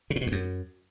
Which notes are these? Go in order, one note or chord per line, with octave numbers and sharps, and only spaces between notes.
C#3
A2
B2
E2
F#2